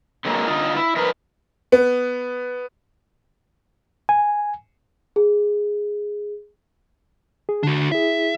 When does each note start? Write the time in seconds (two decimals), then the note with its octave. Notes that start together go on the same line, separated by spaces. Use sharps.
0.25 D3 F#3 G#3 A#3
0.47 D3 D#4 F4
0.76 E4
0.96 F3 D#4 A#4 B4
1.72 B3
4.09 G#5
5.16 G#4
7.49 G#4
7.63 D3 D4 F#4
7.92 E4 G#4 E5